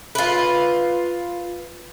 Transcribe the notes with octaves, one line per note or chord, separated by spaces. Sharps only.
F4 B4